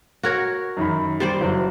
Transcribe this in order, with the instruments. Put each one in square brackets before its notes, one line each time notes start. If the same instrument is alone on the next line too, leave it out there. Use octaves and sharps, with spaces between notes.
[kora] F#4 A#4 C#5
[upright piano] F#2 D#3 B5
[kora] G3 C5 D5
[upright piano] F#1 F#3